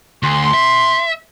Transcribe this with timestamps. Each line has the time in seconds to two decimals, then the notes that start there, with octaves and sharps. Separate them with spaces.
0.23 D2 C6
0.54 E5